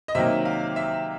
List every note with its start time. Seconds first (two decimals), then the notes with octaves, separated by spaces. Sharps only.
0.08 D#5
0.15 C3 D#3 F#3 A#3 E5
0.45 F5
0.76 E5